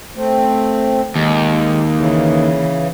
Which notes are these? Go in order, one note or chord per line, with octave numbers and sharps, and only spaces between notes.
A3 C4
D#2 G#3
C#3 E3